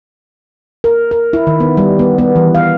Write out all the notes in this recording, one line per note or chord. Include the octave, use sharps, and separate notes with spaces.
A#4
A#4
E4
D#3
B3
G3
B3
B3
E3
F5